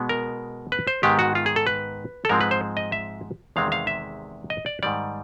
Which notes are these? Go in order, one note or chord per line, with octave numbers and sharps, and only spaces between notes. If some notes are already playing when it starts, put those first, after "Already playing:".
Already playing: B2 G#3 B3
A#4
B4
C5
G#2 D#3 G#3 B3 G4
F#4
F4
G#4
A4
B4
A4
G#2 F3 G#3 C4 A#4
B4
C5
D#5
E5
E2 C3 D#3 G#3 C4 F5
F5
E5
D#5
D5
G#2 D#3 G3 D5